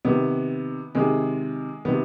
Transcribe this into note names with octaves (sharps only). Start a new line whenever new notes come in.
C3 D#3 B3
C3 D#3 G#3
C3 D#3 B3